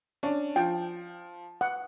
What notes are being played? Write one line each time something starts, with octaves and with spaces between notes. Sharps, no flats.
C#4 D4
F3 G5
F#5